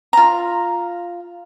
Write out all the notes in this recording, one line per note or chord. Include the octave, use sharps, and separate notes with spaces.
F4 A#5